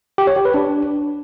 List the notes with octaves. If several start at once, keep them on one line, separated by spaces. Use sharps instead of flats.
G4
C#5
G4
B4
D4